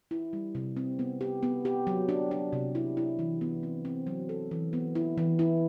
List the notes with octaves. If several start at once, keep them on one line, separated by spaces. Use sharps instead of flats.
E4
G3
C3
C4
B3
G4
B3
G4
F#3
D4
D4
C3
E4
E4
E3
B3
C4
C4
F#3
A4
E3
B3
E4
E3
E4